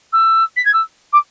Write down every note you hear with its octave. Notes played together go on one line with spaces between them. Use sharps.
E6
B6
G#6
E6
D6